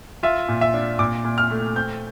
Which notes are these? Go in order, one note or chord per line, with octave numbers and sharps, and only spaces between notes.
F4 E5
A#2
E5
D4
A#2 D6
A#2
F6
A3
C4 G6